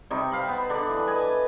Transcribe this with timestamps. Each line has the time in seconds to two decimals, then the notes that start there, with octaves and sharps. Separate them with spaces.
0.10 C3 G3 D#4 C#6
0.31 C5 F5 B5
0.49 B3
0.70 D3 D4 D5
0.89 E3 B5
1.07 B4 D#5 G#5 A5